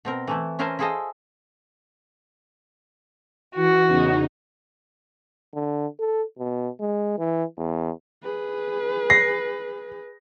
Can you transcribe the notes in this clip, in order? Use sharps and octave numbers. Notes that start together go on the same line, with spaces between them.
B2 C4 A#4
E3 A3 E4
C#4 E4 A#4 C5 G#5 A5
E4 F4 G#4 A4 C5 D#5
E3 F#4
E2 C#3 D#4
D3
A4
B2
G#3
E3
E2
G#4 B4
A#6 C7